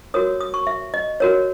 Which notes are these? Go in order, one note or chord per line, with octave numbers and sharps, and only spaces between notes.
F#4 A#4 C#5 D#6
D#6
C#6
E5
D#5
F#4 A#4 C#5